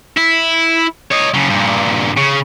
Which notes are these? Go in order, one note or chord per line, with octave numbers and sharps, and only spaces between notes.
E4
C#5 D#5
C#3 F#3
G2 A#2
C#3